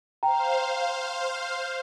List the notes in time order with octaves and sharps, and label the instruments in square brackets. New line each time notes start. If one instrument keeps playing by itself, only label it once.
[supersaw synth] C5 F5 [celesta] G5 A#5